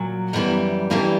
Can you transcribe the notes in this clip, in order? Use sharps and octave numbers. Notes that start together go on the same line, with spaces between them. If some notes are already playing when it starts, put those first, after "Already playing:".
Already playing: A#2 F#3
F#2 E3 G3 B3
G2 E3 G3 A#3 C#4